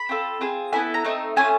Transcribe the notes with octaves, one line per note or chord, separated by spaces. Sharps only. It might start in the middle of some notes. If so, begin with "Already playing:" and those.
Already playing: B5
C4 F4 A4
C4 F4 G#4
B3 E4 A4 G#5
A#5
A3 C4 D#4
A3 C#4 F4 G#5